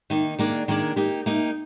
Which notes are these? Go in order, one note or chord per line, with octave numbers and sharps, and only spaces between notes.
D#3 A#3 D#4
D#3 A#3 D4 G#4 D5
D#3 A#3 D4 G#4 D5
A#3 D#4 G4
A#3 D#4 G4